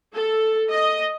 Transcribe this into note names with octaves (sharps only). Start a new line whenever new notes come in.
A4
D#5